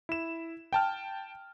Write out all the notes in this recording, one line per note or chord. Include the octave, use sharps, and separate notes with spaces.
E4 E7
G5 A5 F6